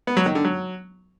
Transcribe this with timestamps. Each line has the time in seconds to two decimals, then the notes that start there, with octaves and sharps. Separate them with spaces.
0.07 B3
0.17 F#3
0.26 D#3
0.35 D3
0.45 F#3